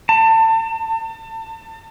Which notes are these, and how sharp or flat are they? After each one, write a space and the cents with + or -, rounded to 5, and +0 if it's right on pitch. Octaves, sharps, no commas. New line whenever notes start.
A5 +30